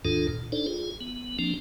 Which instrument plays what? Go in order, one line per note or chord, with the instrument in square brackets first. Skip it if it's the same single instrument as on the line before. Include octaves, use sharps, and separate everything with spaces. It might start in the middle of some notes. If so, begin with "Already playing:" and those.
[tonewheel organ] D#2 G#2 D#3 D4 F4 A4
A#2
D4 D#4 A4 C5 D5
F4 G#4
B3
F3 A#3 C4 D4